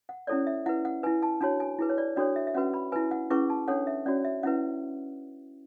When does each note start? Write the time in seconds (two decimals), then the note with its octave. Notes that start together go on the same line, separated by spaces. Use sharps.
0.09 F#5
0.27 C#4 E4 A4 C#5 D5
0.47 E5
0.66 E4 B4 F#5
0.85 F#5
1.03 E4 B4 G#5
1.22 A5
1.41 D4 F#4 C#5 A5
1.60 G#5
1.79 E4 G#4 B4
1.90 C#5
1.98 D5
2.16 D4 F#4 A4 C#5 D5
2.36 E5
2.47 E5
2.54 C#4 F#4 B4 F#5
2.74 B5
2.92 E4 B4 G#5
3.11 F#5
3.30 C#4 E4 G#4 B4 C#6
3.50 A5
3.68 D4 A4 C#5 F#5
3.87 E5
4.06 C#4 F#4 C#5 D5
4.25 E5
4.43 C#4 E4 B4 F#5